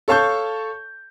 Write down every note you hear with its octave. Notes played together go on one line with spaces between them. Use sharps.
A4 C#5 F5 A5 C#6 G6